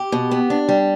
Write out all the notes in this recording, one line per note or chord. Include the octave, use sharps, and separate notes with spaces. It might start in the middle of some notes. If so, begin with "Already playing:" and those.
Already playing: G4
B2
B3
D4
G3